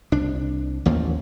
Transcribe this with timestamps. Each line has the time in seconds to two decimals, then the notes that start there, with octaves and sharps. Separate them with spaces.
0.12 C2 D4
0.86 A1 D#2 F3 A#3